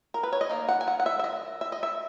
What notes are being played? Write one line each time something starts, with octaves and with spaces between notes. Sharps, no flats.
A#4
B4
C#5
D#5
D#3 A#3
F#5
G#5
F#5
F#5
E5
E5
D#5
E5
D#5
E5